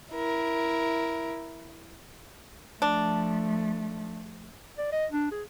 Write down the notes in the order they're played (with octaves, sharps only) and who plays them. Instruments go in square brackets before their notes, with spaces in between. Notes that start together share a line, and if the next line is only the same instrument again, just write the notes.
[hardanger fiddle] E4 A#4
[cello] F3 A3 [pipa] D4
[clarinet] D5
D#5
D4
G#4